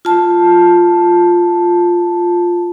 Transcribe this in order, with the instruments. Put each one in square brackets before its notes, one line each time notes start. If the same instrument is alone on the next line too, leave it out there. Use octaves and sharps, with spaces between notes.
[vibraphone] F4 A5